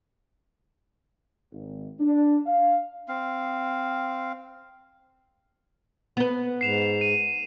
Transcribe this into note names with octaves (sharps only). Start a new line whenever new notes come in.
G#1
D4
F5
C4 F5
B3 B4
G#2 C7 E7 F7
D#7